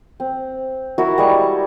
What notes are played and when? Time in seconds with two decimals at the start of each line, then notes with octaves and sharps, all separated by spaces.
0.20 C4
0.98 E4 F#4 A#4
1.18 G3 G#3 C#6